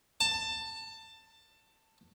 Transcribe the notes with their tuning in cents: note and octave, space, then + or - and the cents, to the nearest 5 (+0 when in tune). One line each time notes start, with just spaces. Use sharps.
A5 +20